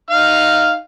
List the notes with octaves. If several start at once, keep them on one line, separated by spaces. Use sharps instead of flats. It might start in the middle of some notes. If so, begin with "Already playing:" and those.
D#4 F5 F6